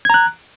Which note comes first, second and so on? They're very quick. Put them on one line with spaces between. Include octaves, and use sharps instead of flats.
G#6 A#5 F#6